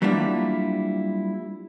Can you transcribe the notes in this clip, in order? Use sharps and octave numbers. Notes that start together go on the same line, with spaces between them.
F#3 G3 A#3 D4 E4 F4